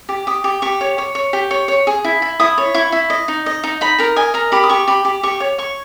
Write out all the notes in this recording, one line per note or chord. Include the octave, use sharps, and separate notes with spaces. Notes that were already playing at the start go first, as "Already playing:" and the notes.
G4
G4 D#6
G4
G4 C#6
C#5
C#5
C#5
G4
C#5
C#5
G#4
E4
E4
E4 D#6
C#5
E4 C#6
E4
D#5
D#4
D#5
D#4
D#4 B5
A#4 A#5
D#5 G#5
A#4 A#5
G4 B5
D#6
G4 C#6
G4 B5
G4
G4 C#6
C#5
C#5 C#6